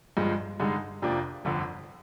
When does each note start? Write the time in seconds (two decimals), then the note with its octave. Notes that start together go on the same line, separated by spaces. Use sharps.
0.17 G1 G2 F3 G#3
0.60 G2 D3 G#3 D#4
1.02 F2 C3 F3 A#3 D4
1.45 G1 F2 D3